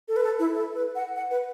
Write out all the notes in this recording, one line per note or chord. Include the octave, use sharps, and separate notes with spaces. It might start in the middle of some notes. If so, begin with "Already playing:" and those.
A4
B4
A4
E4
A4
B4
F#5
F#5
B4